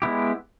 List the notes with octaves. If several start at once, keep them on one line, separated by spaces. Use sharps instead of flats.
G#3 B3 E4 G4